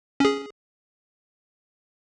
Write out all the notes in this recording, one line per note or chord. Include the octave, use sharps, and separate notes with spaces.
C#4 G#4